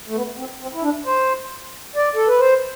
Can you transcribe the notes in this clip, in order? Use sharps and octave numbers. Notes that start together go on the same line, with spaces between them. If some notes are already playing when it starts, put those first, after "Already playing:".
A3
B3
C4
C4
E4
D4
C5
D5
A4
B4
C5